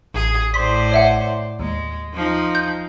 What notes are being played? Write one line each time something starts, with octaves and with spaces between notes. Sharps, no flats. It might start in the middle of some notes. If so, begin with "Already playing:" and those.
A1 G#4
A2 C5 D5 C6 B6
C#5 E5 F#5
D#2 G#3
F3 D#4
G6